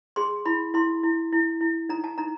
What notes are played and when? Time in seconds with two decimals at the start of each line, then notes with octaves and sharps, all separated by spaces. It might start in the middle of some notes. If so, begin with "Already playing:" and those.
0.16 G#4 C6
0.45 E4 B5
0.74 E4 C6
1.03 E4
1.32 E4
1.61 E4
1.89 D#4 A#5
2.04 A5
2.18 D#4 A#5